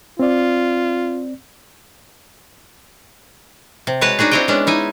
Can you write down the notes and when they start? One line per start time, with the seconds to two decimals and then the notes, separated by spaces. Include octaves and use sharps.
0.19 C4 F4 D5
3.87 C3
4.01 G#3 F#4 B4 C#5 A5
4.19 D4 D#4 F#4 G#4
4.31 C4 D4 E4 C#5 D#5 G5
4.48 G#3 B3 C#4 D4
4.67 D#4 E4 G#5